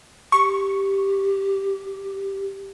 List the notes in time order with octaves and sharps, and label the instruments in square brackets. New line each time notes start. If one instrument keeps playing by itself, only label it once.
[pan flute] G4 [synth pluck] C#6